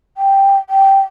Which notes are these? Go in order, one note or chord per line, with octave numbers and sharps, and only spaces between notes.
G5
G5